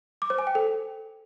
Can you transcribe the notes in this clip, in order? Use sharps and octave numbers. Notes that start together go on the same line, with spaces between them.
D6
C5
G#5
G5
A4